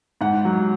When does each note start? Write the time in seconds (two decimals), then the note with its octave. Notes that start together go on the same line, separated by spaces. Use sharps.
0.21 G#2 F#5
0.45 F#3